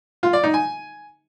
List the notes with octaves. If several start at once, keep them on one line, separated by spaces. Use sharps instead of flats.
F4
D5
D#4
G#5